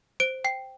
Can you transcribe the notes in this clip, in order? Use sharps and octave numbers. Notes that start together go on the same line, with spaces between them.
C5 D7
G5 C7